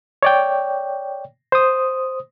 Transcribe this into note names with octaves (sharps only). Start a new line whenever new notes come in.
C#5 D5 G5
C5 D#6